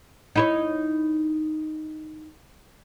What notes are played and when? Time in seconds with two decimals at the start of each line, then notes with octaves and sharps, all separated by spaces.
0.36 D#4 E4 C#5